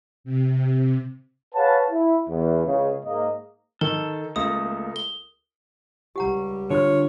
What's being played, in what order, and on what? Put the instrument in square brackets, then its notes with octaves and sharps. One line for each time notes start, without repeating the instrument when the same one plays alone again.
[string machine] C3
[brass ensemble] G#4 B4 C#5 F5 F#5 A5
E4
E2
C#2 C#3
G#2 A#3 D#5
[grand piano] D#3 [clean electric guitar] A4 [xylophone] A#4
[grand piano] C#2 [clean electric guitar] A3 A#3 [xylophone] D#6
[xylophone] G7
[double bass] C#2 G3 [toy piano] G4 F#5 A#5
[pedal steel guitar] D3 F4 F6 [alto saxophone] C#5